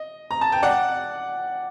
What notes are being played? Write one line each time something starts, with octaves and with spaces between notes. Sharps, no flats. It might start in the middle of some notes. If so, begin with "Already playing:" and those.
Already playing: D#5
A#5
A5
G5
D5 F#5